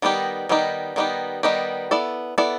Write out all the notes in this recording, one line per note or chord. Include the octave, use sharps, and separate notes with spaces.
D#3 G3 B3 D#4 G4
D#3 G3 B3 D#4 G4
D#3 G3 B3 D#4 G4
D#3 G3 B3 D#4 G4
B3 E4 A4 D5
B3 E4 A4 D5